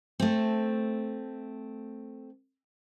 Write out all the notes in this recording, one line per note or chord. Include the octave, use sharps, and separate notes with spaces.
A3 C4